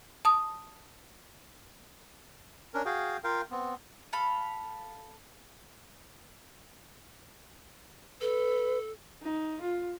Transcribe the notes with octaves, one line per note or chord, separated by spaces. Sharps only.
A5 D#6
C#4 D4 A#4
F#4 G#4 F5 G5
F4 A#4 F5 G5
B3 C4
A4 F5 B5
A4 B4
D#4
F4